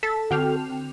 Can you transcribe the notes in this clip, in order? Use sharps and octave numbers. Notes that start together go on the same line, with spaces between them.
A4 A5 B6
D3 C4 F#4 G5 F6 F7